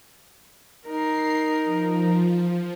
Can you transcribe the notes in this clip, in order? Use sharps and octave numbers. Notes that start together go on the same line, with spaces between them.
D#4 A#4 C7
F3